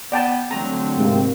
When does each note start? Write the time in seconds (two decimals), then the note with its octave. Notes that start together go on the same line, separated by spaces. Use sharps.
0.12 B3 D5 G5 A5
0.51 D3 F#3 A3 C4 A#5
0.97 G#2 C3 A#3